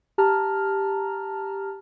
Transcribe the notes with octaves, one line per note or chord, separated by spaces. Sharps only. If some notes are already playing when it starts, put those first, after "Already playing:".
G4 A5 A#5 F6